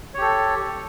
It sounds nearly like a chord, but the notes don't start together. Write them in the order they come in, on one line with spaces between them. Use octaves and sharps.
C#5 G4 A4